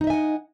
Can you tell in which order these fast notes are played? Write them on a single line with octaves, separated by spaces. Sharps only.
D#4 D#5 E5 G#5 F#5